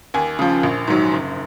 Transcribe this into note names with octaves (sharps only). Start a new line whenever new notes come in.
D#2 G#5
C#3 F3
A#1
G#2 D#3 F#3
F#1